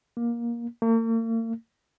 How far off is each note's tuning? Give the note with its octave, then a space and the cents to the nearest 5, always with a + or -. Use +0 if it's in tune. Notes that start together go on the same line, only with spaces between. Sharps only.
A#3 +15
A#3 -45